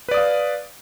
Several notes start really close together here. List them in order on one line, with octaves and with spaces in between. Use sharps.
B4 D5 D#6 F5